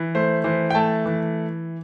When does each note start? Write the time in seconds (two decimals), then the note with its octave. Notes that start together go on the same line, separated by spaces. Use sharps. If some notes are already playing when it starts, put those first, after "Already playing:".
Already playing: E3
0.15 A3 C5
0.44 E3 C5
0.70 G5
0.75 A3 A5
1.06 E3